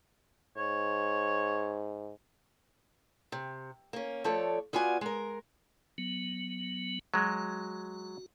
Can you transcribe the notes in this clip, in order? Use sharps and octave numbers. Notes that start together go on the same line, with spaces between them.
G#2 C#5
C3
A#3 C#4
F3 A3 A4 C#5 D5
B3 F4 F#4 D5 G#5
G#3 A#4
F#3 B3
F#3 G#3 F#4